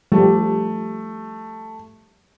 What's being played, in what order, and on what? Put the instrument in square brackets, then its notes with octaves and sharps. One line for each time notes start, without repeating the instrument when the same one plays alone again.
[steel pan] F3 G3 [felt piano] A3